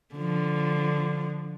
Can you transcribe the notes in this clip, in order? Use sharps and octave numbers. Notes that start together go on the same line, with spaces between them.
D3 F3